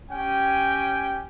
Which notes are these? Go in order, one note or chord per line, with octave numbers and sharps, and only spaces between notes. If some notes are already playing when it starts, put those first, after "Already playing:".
C#4 G4 G5 G#5